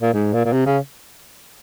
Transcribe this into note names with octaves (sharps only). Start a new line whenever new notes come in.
A#2
G#2
A#2
A#2
C3
C#3